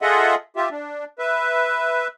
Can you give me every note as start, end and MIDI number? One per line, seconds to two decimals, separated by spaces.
0.02 0.35 65
0.02 0.35 68
0.02 0.35 69
0.02 0.35 75
0.02 0.35 76
0.02 0.35 78
0.56 0.69 65
0.56 0.69 67
0.56 0.69 76
0.71 1.05 62
1.19 2.07 71
1.19 2.07 76